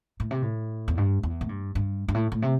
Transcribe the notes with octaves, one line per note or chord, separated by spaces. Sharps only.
A2
C3
A2
E2
G2
E2
A2
G2
G2
G2
A2
A2
C3